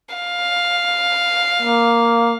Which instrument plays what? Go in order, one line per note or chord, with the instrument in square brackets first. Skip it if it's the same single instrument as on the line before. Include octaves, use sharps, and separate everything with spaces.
[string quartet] F5
[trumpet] A#3